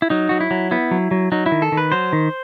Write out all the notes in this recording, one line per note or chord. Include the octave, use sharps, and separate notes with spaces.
E4
F#3 D#4
F#3 F#4
E4
F#3
B3 E4
F#3
F#3
F#3 D#4
E4
D#3
A4
D#3
B4
F#3 C5
D#3